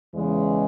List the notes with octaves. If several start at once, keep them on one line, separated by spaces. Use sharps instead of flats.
E2 C#3 E3 G#3